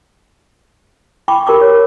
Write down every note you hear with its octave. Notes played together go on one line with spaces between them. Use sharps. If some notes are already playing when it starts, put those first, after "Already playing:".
G5 B5 C#6 D6
G4 A#4 A#5 C#6 D6
C#5